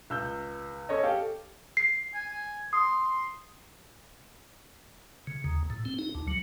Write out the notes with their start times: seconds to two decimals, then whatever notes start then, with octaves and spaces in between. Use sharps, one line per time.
0.10 C#2 E6 G6
0.89 C#4 A4 C#5 D#5
1.04 G4 A4 F5
1.77 C7
2.14 G#5
2.73 C6 D#6
5.27 C#3
5.45 D#2
5.70 A2
5.85 C4
5.99 D#4
6.15 D2
6.28 F#3